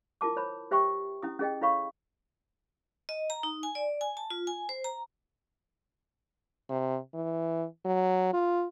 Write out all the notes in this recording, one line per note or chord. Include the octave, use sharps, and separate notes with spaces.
E4 F4 A#4 A5 D6
C5 C#5 B5
G4 C5 E5 G5 C#6
C#4 E4 D#6
C#4 G#4 D#5 G5
E4 A4 C#5 F5 B5 C#6
D#5
A#5
D#4
G#5
D5
G#5
A5
F4
G#5
C5
A#5
C3
E3
F#3
F4